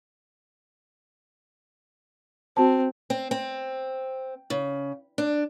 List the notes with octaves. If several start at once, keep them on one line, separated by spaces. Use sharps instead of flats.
C4 F#4 A5
C4
C4
C#3
D4